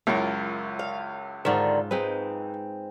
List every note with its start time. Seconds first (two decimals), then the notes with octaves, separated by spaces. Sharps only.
0.07 C#2 F#2 E4 F4 A#4
0.79 F5
1.45 G#2 D3 D#3 F4 E5
1.91 G#3 C4 D#4 B4